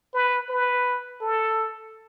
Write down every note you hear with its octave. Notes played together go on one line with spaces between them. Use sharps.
B4
B4
A4